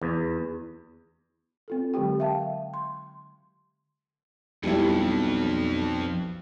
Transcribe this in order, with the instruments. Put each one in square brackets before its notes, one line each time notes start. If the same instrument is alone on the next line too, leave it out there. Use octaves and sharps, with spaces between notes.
[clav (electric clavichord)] E2
[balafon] C4 F4 A4
D3 F#3 G#3 G4 G5
E5 F5 G5 A5
C6
[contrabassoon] B1 [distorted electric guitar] F2 [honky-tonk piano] G3 E4